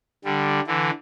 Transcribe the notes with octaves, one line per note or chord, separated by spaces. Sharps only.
D3 G3
D3 E3